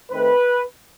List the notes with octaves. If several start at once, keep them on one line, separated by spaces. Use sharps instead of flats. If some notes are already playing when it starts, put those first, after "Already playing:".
D#3 A3 C4 B4